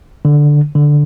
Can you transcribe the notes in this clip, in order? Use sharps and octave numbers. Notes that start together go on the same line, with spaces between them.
D3
D3